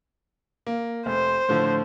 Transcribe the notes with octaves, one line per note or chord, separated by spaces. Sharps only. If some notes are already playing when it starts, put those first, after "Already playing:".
A#3
F1 C5
A2 D3 F3